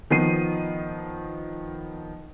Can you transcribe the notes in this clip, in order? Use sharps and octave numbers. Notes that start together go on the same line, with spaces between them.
D#3 F3 B3 C7 D#7